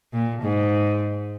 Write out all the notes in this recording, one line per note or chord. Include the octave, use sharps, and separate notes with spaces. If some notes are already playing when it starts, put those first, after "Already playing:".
A#2
G#2